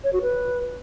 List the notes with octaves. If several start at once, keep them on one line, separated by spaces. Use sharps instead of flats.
C#5
F#4
B4